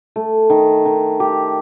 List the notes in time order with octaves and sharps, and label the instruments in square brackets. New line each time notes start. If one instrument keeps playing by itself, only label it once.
[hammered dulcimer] A3
D#3
D#3
G4